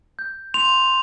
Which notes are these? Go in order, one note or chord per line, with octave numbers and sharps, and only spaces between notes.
G6
C6 F7